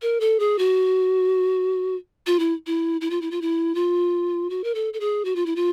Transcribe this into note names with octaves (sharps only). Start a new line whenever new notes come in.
A#4
A4
G#4
F#4
F4
E4
E4
E4
F4
E4
F4
E4
F4
F#4
A#4
A4
A4
G#4
F#4
F4
E4
F4